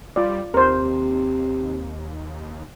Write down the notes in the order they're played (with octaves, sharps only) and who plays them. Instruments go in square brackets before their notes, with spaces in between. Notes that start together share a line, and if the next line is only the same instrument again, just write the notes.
[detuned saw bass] G3 [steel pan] F4 D5
[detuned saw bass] D#2 [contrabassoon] C3 [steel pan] A#4 C5